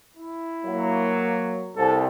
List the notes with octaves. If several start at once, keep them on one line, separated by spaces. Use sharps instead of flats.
E4
F#3 A#3
C2 A4